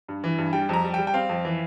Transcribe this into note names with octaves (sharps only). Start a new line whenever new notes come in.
G2
E3
G2
G3 G5
F2 A#5
G3
G5
G3
G5
C4 F5
F2
E3